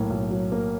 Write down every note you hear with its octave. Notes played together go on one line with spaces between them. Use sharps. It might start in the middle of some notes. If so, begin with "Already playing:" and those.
Already playing: B1 A2 A#3
B1
F#3
A#3